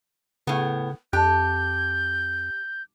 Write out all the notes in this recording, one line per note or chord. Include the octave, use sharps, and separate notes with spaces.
A2 C#3 B3
F2 G4 A5 F#6 G6